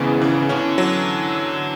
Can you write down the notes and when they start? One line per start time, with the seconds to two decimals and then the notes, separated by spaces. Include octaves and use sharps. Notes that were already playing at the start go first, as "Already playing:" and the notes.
Already playing: G#1 G#2 C#3 E3 B3
0.22 E3
0.49 D3 C#4
0.78 F#3